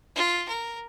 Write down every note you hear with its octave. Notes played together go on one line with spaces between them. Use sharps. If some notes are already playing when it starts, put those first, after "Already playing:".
F4
A#4